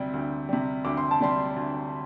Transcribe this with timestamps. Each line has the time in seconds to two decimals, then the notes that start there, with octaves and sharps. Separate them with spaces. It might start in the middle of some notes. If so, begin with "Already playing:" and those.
Already playing: D2 C3 G3 G5
0.13 D2
0.49 C3 G3
0.85 D2 D6
0.97 C6
1.11 A5
1.21 C3 G3 C6
1.56 D2